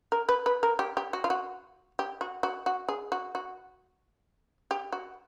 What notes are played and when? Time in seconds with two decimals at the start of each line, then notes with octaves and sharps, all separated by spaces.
0.12 A#4
0.29 B4
0.46 B4
0.63 A#4
0.79 G4
0.97 G4
1.13 F#4
1.24 F4
1.30 F#4
1.99 G4
2.21 F#4
2.43 F#4
2.66 F#4
2.89 G#4
3.12 F#4
3.35 F#4
4.71 G4
4.92 F#4